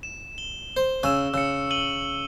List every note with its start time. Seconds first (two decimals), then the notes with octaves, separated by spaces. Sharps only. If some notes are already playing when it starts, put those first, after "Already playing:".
0.03 E7
0.38 G7
0.77 C5
1.03 C#3 G#5 C#6 E6 E7
1.34 C#3 E6 C#7
1.71 D#7 F#7 G7